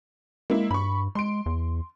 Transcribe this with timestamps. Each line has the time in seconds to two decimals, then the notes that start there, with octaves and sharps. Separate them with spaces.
0.50 G#3 A#3 E4
0.71 G2 B5 C#6
1.15 G#3 C6 D7
1.46 E2